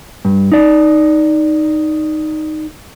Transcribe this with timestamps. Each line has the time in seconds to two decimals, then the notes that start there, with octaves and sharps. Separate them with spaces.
0.25 G2
0.52 D#4 D5